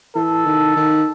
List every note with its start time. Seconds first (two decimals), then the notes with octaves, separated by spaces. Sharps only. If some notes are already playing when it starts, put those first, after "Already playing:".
0.15 E3 A4
0.46 D#3
0.76 D#3